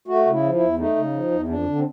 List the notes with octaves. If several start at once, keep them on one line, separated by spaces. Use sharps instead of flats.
A3 F#4
C#3
E4
F3
E4
E2
A3 D#4
C#3
F3
E2
F2 D4
D3
C4